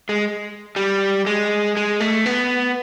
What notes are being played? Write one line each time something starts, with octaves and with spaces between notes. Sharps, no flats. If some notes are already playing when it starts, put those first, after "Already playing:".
G#3
G3
G#3
G#3
A3
B3